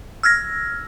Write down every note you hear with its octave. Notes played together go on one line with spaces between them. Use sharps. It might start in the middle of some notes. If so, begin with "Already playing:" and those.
E6 F6 G#6 A#6